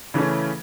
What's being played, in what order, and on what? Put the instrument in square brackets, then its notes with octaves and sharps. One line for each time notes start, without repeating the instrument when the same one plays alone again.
[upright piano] C#3 E3 A3 C#4